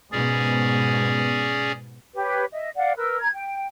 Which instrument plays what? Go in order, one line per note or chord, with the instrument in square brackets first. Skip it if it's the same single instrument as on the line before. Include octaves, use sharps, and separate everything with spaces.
[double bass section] G#2 B2 B3 [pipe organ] C#4 G#4 D5
[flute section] G4 B4 C#5
D#5 E5
D5 F5 F#5
A#4 B4 E6
A#5 G#6
G5